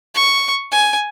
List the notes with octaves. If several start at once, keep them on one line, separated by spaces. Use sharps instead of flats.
C#6
G#5